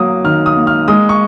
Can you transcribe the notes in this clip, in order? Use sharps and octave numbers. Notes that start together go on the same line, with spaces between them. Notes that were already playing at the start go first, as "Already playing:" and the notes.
Already playing: F#3 A#3 D#6
D#3 F6
D#6
A#3
F6
G#3 D#6
C#6